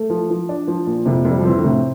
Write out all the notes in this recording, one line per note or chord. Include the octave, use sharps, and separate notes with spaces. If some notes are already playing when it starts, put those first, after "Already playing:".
Already playing: A3
F3
F3
D4
F3
A#2
F2 C3
F2
G3
F3
E3 C4
D3
A2 C3